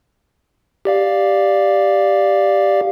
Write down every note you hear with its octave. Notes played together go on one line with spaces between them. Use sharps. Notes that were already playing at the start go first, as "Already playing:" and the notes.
G4 D5 F5